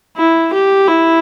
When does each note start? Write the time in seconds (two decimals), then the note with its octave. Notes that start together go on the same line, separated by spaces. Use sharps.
0.16 E4
0.53 G4
0.88 E4